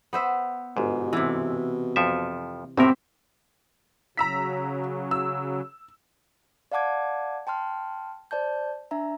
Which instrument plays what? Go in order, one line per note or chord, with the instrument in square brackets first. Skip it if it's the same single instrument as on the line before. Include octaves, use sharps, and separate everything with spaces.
[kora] B3 C5 E5
[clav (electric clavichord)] G1 G#2 [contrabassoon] B2
[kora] C3 E3
[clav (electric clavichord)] F2 F3 E5
[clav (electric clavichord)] A2 C3 A#4 [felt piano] C4 [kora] G4 E5
[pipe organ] C#3 F#3 [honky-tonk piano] A#5 E6 B6
[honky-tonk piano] E6
[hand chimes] D5 F5 F#5 A5 D6 G#6
G5 A5 C6 F6
C5 D5 A5 G6
D4 E5 A#5